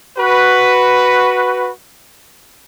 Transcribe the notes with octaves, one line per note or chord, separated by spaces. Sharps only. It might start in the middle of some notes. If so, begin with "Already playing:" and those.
F#4 B4